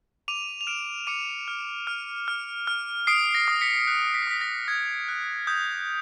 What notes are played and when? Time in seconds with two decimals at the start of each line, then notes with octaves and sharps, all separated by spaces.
0.28 D6 D#7 F7
0.61 F7
0.67 F6 D7 E7
1.07 D6 C#7 D#7
1.48 F6
1.87 F6
2.28 F6
2.67 F6
3.07 D#6 C7 D7
3.35 A#6
3.48 D#6
3.61 B6 C#7
3.87 F#6 C7
4.14 B6
4.22 C7
4.27 D#6 B6
4.37 B6
4.41 A#6
4.68 D#6 G#6
5.08 F#6
5.47 D#6 G6